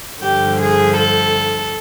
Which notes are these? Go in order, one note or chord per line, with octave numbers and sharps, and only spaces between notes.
G2 D3 F3 G4
G#4
A4